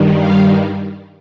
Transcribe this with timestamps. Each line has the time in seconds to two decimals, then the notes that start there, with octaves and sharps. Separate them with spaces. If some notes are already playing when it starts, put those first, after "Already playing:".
Already playing: G2 D#3 G3
0.17 F5